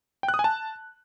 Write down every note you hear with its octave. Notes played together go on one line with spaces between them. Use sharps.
G5
F#6
D#6
G#5
A5